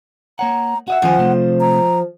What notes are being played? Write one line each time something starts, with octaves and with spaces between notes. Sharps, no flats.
A#3 C#5 F#5 A#5
F#4 D#5 E5 F#5
D#3 F3 C#4 C5 G#5
C3 A3
A#5